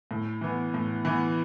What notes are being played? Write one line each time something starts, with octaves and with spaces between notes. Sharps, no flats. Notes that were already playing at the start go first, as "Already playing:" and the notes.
A2
E3 B3
A2
E3 B3